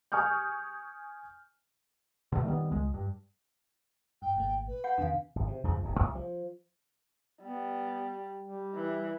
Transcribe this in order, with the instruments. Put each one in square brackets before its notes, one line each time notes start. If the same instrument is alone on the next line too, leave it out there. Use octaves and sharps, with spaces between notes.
[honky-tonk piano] G#5 C#6 D#6 F6 G6
[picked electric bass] B2 D3 G3 A3
D#3 G3 A#3 B3
C#2 G#3
G2
[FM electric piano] G2 [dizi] G5
[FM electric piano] G#1 A#2 A3
[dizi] B4
[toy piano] F#5 [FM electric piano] B5 G6
[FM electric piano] E2 C3 D#3 [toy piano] D4 F5
[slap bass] G#1
C3
E2 G2 C#3 F3
D1 G1 D2
C2
F3
[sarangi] G3 [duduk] B3
[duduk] G3
[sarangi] E3